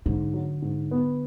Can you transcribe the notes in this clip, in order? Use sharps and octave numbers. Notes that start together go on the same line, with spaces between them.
G#2 D3
F#3
G#2
B3